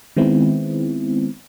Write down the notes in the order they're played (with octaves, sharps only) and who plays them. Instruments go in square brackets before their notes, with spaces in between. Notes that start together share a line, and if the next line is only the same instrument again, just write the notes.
[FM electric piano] D#3 G#3 B3 C4 E4